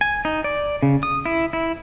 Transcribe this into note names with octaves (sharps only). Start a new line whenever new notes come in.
G#5
D#4
D5
C#3
D#6
E4
E4